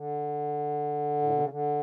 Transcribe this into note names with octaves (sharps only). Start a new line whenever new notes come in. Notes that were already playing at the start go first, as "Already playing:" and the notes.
Already playing: D3
A2
B2
C#3
D3